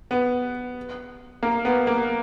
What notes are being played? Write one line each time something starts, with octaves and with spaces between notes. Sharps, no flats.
B3
A#3
B3
A#3